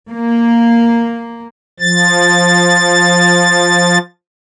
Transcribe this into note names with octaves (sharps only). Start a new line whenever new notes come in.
A#3
F3 A6